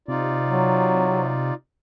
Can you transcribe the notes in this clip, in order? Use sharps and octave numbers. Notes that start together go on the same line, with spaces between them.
C3 D#4 F4 D5
F#3